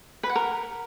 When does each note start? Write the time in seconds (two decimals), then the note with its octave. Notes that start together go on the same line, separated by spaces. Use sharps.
0.23 B4
0.29 F#5
0.36 A#4